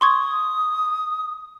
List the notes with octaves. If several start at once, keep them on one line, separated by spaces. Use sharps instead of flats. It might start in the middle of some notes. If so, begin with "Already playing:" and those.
C6 C#6 D#6 G#6